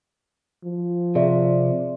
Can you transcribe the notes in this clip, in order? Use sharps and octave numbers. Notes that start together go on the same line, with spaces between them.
F3
C3 G#4 D5 E5